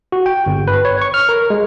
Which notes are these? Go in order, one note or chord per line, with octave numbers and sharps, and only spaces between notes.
F#4
G5
G1
B4
C#5
C#6
F6
A#4
G#3